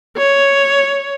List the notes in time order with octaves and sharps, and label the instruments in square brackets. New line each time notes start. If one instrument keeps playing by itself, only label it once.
[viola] C#5